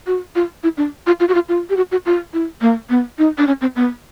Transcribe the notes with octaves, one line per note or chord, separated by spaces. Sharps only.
F#4
F4
E4
D4
F4
F4
F#4
F4
F4
G4
F#4
F#4
F4
E4
A#3
B3
D#4
D4
C#4
C4
B3